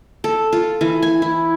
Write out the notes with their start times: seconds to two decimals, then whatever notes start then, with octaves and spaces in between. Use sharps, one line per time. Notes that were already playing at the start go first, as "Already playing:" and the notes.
0.24 A4
0.53 F4
0.81 E3
1.02 G#5
1.22 E4